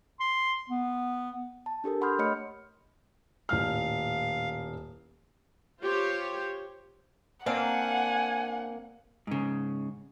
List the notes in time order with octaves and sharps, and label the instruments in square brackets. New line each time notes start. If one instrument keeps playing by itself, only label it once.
[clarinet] C6
B3
[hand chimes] A5
D4 G4 A4 A#4
F#5 B5 C6 D#6 F6 G6
A3 C#5 D#5 B5 F6 C#7
[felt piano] D#1 A2 F6 [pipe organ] F5
[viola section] F4 G4 C5 C#5
[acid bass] A#3 [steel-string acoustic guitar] C4 D4 F5 [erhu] F#5 [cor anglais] G#5
[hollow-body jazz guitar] G#2 C#3